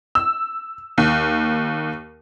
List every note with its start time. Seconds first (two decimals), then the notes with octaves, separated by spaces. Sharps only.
0.15 E6
0.98 D#2